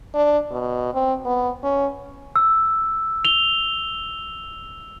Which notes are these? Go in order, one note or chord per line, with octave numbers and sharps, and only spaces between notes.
D4
B2
C4
B3
C#4
E6
F7 G7